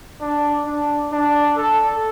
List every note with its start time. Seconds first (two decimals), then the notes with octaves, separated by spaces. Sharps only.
0.21 D4
0.66 D4
1.12 D4
1.58 A4